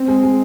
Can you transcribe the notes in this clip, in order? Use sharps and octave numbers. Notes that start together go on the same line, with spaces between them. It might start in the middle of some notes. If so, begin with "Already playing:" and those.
Already playing: C4
G#3
G#3